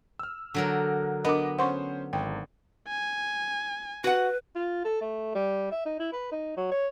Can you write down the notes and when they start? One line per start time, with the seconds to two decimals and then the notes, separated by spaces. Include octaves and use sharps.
0.19 E6 F6
0.54 D3 F#3 A#4
1.25 B3 D4 A#4 D#5 B5 D6
1.59 C#4 C5 F#5 C6 C#6
2.13 G#1 G5
2.88 G#5
4.04 F#4 B4 F#5
4.55 F4
4.85 A4
5.01 A3
5.35 G3
5.72 E5
5.85 D#4
5.99 E4
6.13 B4
6.31 D#4
6.57 F#3
6.71 C#5